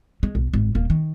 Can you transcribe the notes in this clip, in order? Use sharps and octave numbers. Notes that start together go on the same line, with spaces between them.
G#3
B1
G#1
D#1 A#3
D#3